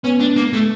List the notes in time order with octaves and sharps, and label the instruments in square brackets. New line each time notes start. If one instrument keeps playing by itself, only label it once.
[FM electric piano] B3 [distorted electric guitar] C#4
[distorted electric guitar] D4
A#3
A3